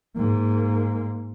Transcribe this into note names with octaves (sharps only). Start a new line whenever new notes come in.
G#2 A#3